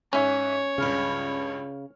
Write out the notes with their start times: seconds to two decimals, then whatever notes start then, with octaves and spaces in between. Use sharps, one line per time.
0.13 G#2 C#4 C#5 E5
0.78 C#2 G2 C#3 F6